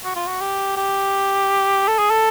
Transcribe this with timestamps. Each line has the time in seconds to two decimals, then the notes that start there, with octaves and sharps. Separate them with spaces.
0.04 F#4
0.16 F4
0.27 F#4
0.41 G4
0.77 G4
1.88 A4
1.99 G#4
2.10 A4